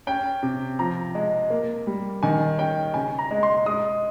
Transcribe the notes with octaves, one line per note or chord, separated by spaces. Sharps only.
C#4 G5
C3
F3 A#5
G#3
A#3
G3
D#3 G#5
C#4 G5
C#3 G#5
A#5
G#3
C6
G#3 D#6